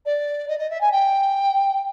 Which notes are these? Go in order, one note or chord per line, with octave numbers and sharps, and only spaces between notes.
D5
D#5
D#5
E5
G#5
G5